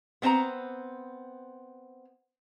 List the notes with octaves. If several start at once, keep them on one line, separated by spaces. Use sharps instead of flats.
B3 C4 C5 G5 A#5